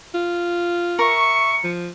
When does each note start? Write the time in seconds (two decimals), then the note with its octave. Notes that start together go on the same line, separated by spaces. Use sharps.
0.15 F4
0.99 A#4 E5 C#6 C#7
1.64 F3